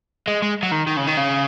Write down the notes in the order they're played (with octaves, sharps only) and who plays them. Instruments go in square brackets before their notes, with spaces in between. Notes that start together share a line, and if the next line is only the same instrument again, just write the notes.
[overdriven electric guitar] G#3
G#3
F#3
D#3
D#3
C#3
D#3
C#3